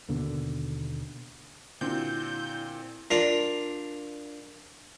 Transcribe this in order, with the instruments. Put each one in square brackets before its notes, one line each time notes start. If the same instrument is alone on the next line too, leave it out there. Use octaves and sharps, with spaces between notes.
[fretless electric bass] D#2 B2 D3 A#3
[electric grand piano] A#2 C4 [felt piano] D3 F#4 [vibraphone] E4 [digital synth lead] G6
[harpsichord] D4 F4 A#4